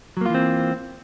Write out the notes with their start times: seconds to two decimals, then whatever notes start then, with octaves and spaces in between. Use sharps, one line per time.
0.17 F#3
0.21 A#3
0.26 F4
0.30 E3
0.34 C4